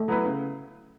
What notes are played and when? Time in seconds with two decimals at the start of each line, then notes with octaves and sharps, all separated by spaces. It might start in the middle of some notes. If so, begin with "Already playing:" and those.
Already playing: A3
0.08 F#3 B3 E4 B4
0.25 C#3